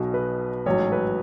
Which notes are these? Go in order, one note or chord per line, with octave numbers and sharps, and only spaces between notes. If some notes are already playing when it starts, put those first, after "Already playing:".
Already playing: B1 B2 F#3
B4
A1 G#2 F#3 C#5
B4